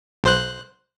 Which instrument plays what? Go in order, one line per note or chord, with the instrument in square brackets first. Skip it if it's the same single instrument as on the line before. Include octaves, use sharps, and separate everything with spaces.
[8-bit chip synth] B1 C5 F#6